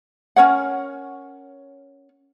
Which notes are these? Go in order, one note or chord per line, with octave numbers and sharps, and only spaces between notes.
C#4 A#4 C#5 F#5